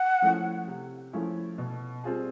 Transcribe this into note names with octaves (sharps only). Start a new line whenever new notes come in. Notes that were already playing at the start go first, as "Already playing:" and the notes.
Already playing: F#5
F3 A3 C#4 E4
C3
F3 A3 C#4 E4
B2
G3 C4 F4 G#4